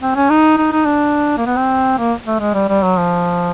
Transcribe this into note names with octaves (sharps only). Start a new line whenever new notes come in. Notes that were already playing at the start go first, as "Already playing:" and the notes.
C4
C#4
D#4
D#4
D#4
D4
A#3
B3
C4
A#3
A3
G#3
G3
G3
F#3
F3